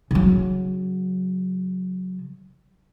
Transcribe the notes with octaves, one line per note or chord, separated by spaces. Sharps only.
C#3 F#3